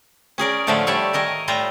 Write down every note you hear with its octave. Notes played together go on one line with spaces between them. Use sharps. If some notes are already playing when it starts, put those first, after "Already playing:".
C#4 G#4 A#4 D5
A2 D3 F3 A3 E5 F5
G3 G4 C#5 D5 E5
D#3 A#4 D#5 G#5
A2 G3 F4 E5 A#5